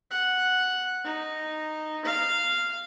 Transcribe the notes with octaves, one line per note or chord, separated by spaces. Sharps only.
F#5
D#4
F5